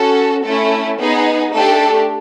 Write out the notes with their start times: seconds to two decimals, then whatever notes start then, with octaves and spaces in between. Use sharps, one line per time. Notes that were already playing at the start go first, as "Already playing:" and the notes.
Already playing: C#4 F#4 A4
0.45 A3 C#4 E4 A4
1.00 B3 D#4 G#4
1.53 A3 D4 G4 A4